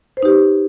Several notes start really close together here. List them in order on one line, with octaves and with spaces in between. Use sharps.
C5 B4 D#4 G4